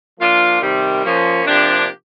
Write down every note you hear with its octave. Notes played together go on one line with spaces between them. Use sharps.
F3 A#3 D4 F4
C3 D#3 G3
F3 A#3 C#4
C3 F3 A#3 D4 G4